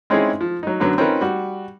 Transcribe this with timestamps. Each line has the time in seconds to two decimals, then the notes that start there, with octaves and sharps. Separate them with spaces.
0.10 G#3 C4 C#4 D#4 E4 G#4
0.41 F3
0.63 F#3 D#4
0.80 F#2 D3 F#3 B3
0.98 C4 C#4 D#4 F4 A#4 B4
1.21 G3 F#4